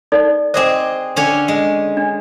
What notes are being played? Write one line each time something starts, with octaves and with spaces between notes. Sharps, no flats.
D#4 A4 D5
C4 G#4 C5 D#5 D6
D3 C#4 C#5
G#3
D4